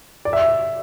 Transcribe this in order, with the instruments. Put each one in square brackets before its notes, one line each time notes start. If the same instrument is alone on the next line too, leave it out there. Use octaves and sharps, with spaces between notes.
[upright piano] D5
E5